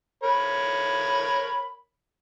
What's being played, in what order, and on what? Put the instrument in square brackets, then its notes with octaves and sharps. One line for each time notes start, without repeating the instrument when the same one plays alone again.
[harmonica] A#4 C#5 B5